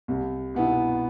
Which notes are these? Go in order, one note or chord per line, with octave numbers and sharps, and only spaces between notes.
C2
B2 B3 E4